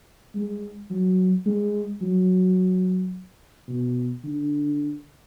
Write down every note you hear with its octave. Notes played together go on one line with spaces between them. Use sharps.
G#3
F#3
G#3
F#3
B2
D3